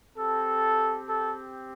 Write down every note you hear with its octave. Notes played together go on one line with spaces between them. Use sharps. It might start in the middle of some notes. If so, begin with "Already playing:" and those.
C4 G4 A4
A4